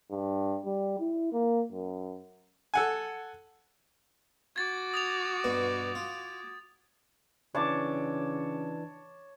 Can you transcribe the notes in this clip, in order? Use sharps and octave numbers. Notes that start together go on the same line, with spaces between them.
G2
G3
E4
A#3
F#2
A4 F#5 G#5
F#4 D6 G#6 A6
D#6 A6 F7
G2 B2 B4
F4
C#3 E3 D4 C#5 A5 D6